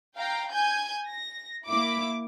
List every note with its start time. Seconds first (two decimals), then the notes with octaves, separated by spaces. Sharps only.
0.17 F5 G5 A#5
0.52 G#5 G6 G#6
1.07 A#6
1.67 A#3 E4 D6